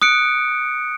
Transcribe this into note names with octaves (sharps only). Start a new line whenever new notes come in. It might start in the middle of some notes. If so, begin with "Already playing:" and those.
D#6 F#6 C#7 D7